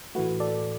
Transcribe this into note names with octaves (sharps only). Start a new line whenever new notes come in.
A2 E3 A3 F#4 B4
A4 D5